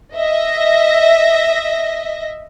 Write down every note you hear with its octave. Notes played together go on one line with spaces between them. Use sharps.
D#5 E5 A#6